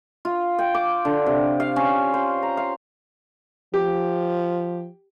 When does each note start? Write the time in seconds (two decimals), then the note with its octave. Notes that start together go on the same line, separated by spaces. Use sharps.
0.25 F4
0.59 G5
0.75 D6
1.05 D3
1.26 C3
1.60 F5
1.76 C#4
2.14 C5
2.43 A#5
2.57 F5
3.74 F3 G4